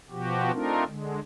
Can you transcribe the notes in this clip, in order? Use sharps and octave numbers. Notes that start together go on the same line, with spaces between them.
B2 F3 F#4 G4
A3 C4 D4 D#4 F4 A#4
D3 G#3